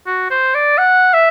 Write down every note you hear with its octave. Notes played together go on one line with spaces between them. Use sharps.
F#4
C5
D5
F#5
E5